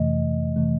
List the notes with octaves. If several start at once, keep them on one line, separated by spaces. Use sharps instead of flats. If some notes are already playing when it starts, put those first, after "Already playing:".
Already playing: F2 C3 E3 A3 D#5
C3 E3 A3